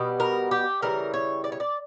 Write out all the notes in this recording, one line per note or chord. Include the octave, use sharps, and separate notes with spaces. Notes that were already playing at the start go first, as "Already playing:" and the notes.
Already playing: B2 G3 B3
A#4
G4
C#3 E3 G3 A#4
C#5
D5
C#5
D5